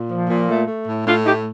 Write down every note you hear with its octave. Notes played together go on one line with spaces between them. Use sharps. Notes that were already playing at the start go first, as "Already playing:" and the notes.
Already playing: A#2
F3
A#2
A3
A3
A2
A2 D4 F4
A3 D#4 G4